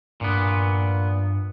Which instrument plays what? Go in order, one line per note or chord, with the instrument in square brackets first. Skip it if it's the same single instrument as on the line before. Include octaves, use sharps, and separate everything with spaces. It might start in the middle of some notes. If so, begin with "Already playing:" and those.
[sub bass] G2 [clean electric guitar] A#2 B3